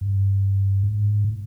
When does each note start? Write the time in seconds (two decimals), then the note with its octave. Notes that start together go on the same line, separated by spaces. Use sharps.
0.01 G2
0.83 G#2
1.24 A2